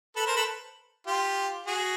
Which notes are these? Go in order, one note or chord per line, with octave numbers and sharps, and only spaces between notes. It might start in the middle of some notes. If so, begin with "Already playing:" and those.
A4 B4
A#4 C5
A4 B4
F4 G4
F#4 G#4